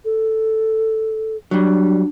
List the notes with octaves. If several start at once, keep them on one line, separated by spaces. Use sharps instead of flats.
A4
F#3 G3 D4